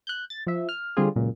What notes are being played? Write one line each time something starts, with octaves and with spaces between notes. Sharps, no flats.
F#6 G6
A6
F3 E5
F6
D3 G3 C4 F4 G#4
C#2 F#2 A#2